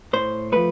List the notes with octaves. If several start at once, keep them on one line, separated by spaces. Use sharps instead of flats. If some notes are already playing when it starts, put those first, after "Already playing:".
A2 C5
F3 A3 B4